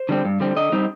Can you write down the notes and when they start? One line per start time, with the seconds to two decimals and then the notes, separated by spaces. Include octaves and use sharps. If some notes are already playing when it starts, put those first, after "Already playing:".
Already playing: C5
0.09 D3 G3 C4
0.25 G2
0.40 D3 G3 C4
0.56 D3 D#5
0.72 G3 C4 D#4